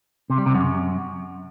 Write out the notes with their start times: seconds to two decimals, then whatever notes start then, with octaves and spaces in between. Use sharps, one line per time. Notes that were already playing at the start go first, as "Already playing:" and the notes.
0.30 C3
0.38 G3
0.46 C3
0.55 F#2